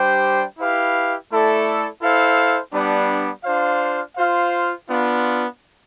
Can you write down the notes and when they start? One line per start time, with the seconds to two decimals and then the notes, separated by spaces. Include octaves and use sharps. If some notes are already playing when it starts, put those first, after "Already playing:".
Already playing: G3 D4 G4 C5 G5
0.58 E4 G4 B4 F5
1.30 A3 E4 A4 D5
2.01 E4 A4 C5 F5
2.73 G3 B3 D4
3.44 D4 F4 C5 F5
4.17 F4 C5 F5
4.88 B3 D4 F4